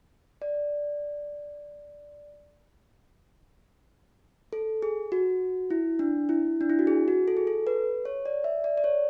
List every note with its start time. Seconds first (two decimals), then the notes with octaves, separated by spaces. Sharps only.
0.42 D5
4.53 A4
4.82 G#4
5.12 F#4
5.70 E4
5.99 D4
6.29 E4
6.61 D4
6.70 E4
6.79 F#4
6.87 G#4
7.08 F#4
7.28 A4
7.37 G#4
7.47 A4
7.67 B4
8.05 C#5
8.26 D5
8.44 E5
8.64 D5
8.77 D5
8.84 C#5